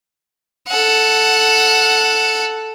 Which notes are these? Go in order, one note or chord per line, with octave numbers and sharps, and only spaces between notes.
A4 F#5